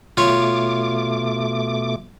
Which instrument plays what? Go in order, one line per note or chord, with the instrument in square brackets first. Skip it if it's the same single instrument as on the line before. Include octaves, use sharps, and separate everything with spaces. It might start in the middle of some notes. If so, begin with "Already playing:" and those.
[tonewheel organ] B2 A3 D6 [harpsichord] F4 C#5